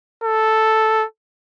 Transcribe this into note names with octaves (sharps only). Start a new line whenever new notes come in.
A4